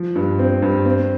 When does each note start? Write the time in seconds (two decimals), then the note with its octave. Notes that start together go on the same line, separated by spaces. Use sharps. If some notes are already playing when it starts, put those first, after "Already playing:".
Already playing: F3
0.16 G2
0.39 C4
0.62 G2
0.85 C4